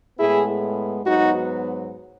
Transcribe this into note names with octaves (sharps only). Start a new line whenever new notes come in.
A2 G#3 B3 E4 G#4
G#2 F#3 B3 D#4 F#4